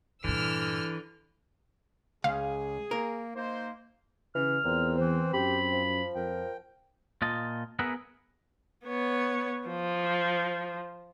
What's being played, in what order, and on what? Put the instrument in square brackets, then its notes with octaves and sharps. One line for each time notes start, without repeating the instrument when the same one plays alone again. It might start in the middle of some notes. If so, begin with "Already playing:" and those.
[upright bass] G2 A#2 [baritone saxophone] D3 [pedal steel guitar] E3 [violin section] E6 F6
[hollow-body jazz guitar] C#2 [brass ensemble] G#4 [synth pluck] F5
[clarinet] A#3 [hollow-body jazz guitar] A#4
[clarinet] A#3 [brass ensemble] D#4 C5
[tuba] C#3 [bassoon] E3 [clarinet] F6
[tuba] E2 [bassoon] A#2 [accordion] C4
[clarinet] E3 [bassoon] C5
[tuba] F#2 [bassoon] G4 [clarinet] B5
[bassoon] F3
[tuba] F2 [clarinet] A#4 [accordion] G5
[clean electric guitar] A#2 F4 D#5 A5
B3 G#4 A#4 B4 E5 F#5
[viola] B3 C#5
F3